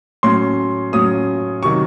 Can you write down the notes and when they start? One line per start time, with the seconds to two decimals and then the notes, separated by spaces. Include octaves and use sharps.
0.23 A2 F#3 C#4 C6
0.93 A2 F#3 C#4 D#6
1.63 C3 D#3 F#3 C#6